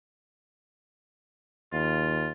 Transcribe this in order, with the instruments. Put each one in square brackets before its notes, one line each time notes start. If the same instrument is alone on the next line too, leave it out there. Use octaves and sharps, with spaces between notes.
[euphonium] D#2 [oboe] F4